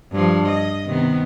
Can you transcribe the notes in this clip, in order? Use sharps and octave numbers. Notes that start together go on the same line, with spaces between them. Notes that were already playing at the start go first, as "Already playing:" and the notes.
G2 F3
D#5
C3 D#3 B3